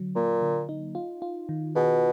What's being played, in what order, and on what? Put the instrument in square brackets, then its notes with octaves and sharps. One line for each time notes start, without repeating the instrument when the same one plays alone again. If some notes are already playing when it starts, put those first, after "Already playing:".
Already playing: [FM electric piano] D3 F#3
[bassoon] A#2 [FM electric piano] A#3
[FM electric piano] D3
D#4
F4
F4
D#3
[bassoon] B2 [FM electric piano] G#4